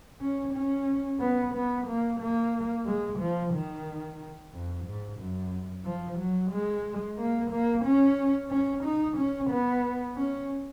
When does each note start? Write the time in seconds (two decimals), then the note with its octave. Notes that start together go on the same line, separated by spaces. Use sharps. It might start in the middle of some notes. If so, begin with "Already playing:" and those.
0.21 C#4
0.54 C#4
1.20 B3
1.54 B3
1.87 A#3
2.20 A#3
2.86 G#3
3.19 F3
3.53 D#3
4.53 F2
4.86 G#2
5.19 F#2
5.85 F3
6.19 F#3
6.51 G#3
7.19 A#3
7.51 A#3
7.85 C#4
8.51 C#4
8.84 D#4
9.17 C#4
9.50 B3
10.16 C#4